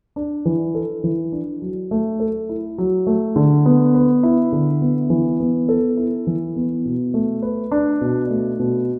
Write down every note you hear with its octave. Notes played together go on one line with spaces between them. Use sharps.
D4
E3
A4
E3
D4
F#3
A3
A4
E4
F#3
A3
D3
B3
B4
E4
D3
B3
E3
B3
A4
E4
E3
B3
B2
A3
B4
D4
B2
A3
B2